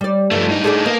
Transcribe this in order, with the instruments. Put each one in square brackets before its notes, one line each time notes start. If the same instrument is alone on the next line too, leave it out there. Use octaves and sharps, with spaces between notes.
[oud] G3 D5
[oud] G2 [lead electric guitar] F3 A3
[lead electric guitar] A2 D#4
[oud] D4 G#4 A4
[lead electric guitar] A#3 [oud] B3